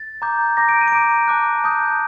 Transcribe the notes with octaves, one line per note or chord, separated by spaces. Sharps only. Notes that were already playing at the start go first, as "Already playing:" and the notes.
Already playing: A6
A#5 D6 G6
A#5 D6 G6 A#6
D7
D#7
D7
A#5 D6 G6 D#7
A5 D6 F#6
A5 D#6 G6